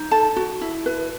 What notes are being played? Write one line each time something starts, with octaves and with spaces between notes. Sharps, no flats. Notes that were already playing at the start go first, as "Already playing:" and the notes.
Already playing: D#4
A4 A5
F#4
E4
B4